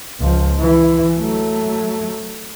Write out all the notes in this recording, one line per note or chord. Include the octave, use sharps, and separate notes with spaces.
C#2 F3
E3
F#3 A3